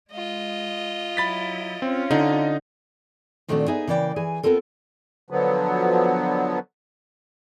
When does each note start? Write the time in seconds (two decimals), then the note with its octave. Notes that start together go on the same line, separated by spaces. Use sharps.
0.11 G#3 F4 D#5
1.17 F#3 E4 B5 A6 B6
1.82 C4 C#4 F4
2.11 D3 D#4 D#5
3.48 A#2 D#3 A3 C4 D4 F#4
3.68 B3 D#4 G#4 E5 G#5
3.87 C#3 E3 A#3 D5 E5 G5
4.16 E3 G#4 G#5
4.43 B3 C4 F4 A4 A#4
5.30 D3 F3 F#3 B3